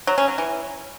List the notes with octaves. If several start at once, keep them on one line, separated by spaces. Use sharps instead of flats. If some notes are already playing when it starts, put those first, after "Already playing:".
F#3
C#4
F#3
E3